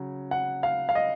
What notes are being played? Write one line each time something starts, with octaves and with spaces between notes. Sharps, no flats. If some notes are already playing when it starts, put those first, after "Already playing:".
Already playing: C#3 F#3
F#5
F5
F5
D#5